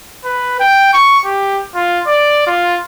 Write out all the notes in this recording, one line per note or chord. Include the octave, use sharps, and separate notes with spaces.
B4
G5
C#6
G4
F4
D5
F4